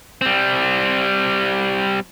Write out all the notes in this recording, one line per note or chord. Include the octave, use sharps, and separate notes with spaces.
G3 C4